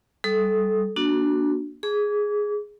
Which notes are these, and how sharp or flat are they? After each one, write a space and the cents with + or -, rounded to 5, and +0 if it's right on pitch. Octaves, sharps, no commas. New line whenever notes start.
G3 -10 A4 -20 D#6 +0
A#3 +35 D4 +0 F#4 +0
G#4 +0 D6 -35